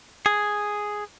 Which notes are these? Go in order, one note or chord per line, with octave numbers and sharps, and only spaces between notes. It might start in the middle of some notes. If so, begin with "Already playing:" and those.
G#4